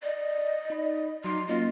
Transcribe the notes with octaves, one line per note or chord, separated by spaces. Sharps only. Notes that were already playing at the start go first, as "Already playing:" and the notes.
D5 D#5
D#4 B5
F#3 D#4 C6 D6 F6
A#3 C#4 F4 F#4 D#5